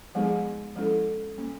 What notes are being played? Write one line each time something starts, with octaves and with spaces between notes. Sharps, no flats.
F3 G#3 B3 D#4 G#4
F3 G#3 C#4 E4 A4
G3 A#3 C#4